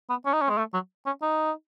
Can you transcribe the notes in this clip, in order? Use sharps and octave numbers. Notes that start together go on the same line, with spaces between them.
B3
C#4
D#4
C#4
G#3
A3
F#3
C#4
D#4